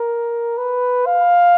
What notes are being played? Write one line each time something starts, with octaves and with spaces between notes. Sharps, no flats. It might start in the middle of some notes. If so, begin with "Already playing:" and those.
Already playing: A#4
B4
F5